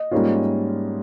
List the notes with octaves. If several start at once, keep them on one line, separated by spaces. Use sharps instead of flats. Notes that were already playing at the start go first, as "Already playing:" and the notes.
Already playing: D#5
G#2 G3 A#3 C#4 F4